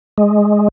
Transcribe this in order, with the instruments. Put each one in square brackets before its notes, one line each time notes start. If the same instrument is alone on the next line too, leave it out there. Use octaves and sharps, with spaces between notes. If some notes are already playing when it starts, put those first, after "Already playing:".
[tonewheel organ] G#3